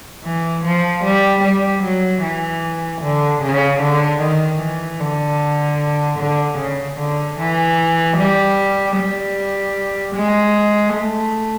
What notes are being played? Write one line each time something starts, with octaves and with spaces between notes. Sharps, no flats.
E3
F3
G3
G3
F#3
E3
D3
C#3
D3
D#3
E3
D3
D3
C#3
D3
E3
G3
G3
G#3
A3